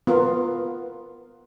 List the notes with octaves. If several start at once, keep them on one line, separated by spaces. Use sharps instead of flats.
B3 F4 A#4